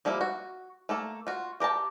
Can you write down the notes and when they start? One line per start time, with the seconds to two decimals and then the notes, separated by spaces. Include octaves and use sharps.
0.05 F3 G3 A#3 E4
0.21 F#4
0.89 A3 A#3 A4
1.27 F4 F#4
1.60 G4 A#4 G5 A5